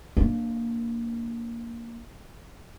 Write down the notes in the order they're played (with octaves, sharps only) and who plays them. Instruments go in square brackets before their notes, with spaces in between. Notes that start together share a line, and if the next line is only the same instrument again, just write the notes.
[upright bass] A#3 D4